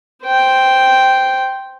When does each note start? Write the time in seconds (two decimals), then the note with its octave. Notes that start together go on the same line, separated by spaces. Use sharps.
0.25 C5 G5